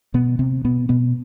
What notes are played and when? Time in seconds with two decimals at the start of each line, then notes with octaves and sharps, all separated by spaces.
0.14 B2 B3
0.39 C3 C4
0.65 B2 B3
0.89 B2 B3